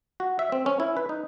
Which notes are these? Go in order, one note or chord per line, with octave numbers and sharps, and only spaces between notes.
F#4
E5
C4
C#4
E4
B4
D#4